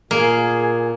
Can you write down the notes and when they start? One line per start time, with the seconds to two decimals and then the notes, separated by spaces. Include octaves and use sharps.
0.11 A#2 A#3 G#4